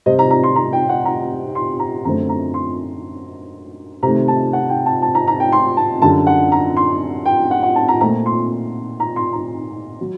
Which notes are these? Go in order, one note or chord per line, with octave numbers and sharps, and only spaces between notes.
C3 G3 C4 D#5
A#5
A#5
C6
A#5
G5
F#5
A#5
C6
A#5
F#2 D3 A3 C4 A#5
A#5
C6
C3 D#3 A3 C4 A#5
A5
F#5
G5
A5
A5
A#5
A#5
G5
C6
A5
F#2 D3 G3 A5
F#5
A#5
C6
G5
F#5
F#5
A5
A#5
A#2 A3 C4 A#5
C6
A#5
C6
A#5
F#3